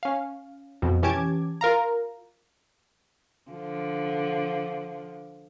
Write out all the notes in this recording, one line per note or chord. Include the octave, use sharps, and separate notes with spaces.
C#4 F5
F2 B2
E3 C#4 G4 A5 D6 G#6
F4 A#4 F5 A#5
D3 F3